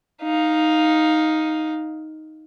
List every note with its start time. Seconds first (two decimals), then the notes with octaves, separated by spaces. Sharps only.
0.22 D#4 F5